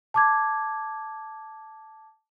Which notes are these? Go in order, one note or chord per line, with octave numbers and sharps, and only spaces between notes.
A5 D6 G#6